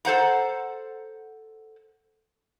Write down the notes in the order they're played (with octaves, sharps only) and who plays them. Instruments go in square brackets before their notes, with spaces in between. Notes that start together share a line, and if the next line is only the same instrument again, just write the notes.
[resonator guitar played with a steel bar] A4 C5 F#5 A#5